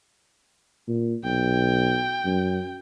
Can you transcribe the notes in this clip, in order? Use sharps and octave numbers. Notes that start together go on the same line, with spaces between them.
A#2
B1 G5
F#2